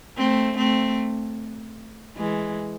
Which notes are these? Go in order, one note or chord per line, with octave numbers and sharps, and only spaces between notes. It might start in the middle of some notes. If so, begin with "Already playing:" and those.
A3 C4
A3 C4
E3 G#3